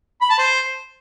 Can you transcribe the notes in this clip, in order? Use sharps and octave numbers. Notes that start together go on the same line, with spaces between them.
B5
A5
C5